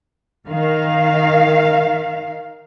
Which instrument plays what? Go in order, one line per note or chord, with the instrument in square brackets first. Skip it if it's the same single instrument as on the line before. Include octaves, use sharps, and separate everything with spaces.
[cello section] D#3 F5